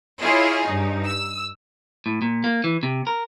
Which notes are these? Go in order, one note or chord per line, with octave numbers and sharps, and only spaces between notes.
E4 F4 G#4 C#5 D#5
G2 D#4
E6
A2
A#2
A#3
E3
C3
A#4